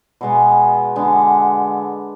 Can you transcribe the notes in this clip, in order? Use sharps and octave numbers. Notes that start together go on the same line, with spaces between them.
B2 G#3 B3
D3 G#3 B3